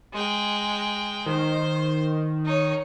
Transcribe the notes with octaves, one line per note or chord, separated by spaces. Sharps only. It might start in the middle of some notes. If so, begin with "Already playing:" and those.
G#3 G5
D#3 C5
D#4 C#5